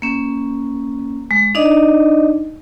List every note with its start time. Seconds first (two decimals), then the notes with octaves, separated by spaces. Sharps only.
0.02 A#3 C#4
1.31 G#3
1.55 D4 D#4 D5 D#5